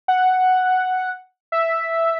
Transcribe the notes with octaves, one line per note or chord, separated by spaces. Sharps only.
F#5
E5